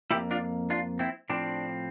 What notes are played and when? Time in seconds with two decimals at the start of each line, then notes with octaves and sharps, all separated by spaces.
0.11 F2 E3 A#3 E4 G4
0.31 D4 F4
0.70 D4 F4
0.99 C4 E4
1.29 A2 F3 C4 D4